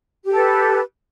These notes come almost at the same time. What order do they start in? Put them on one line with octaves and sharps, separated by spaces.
G4 A4 B4